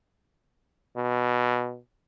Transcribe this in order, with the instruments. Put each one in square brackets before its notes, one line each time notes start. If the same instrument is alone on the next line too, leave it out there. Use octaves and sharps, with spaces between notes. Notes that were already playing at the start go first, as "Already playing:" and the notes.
[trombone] B2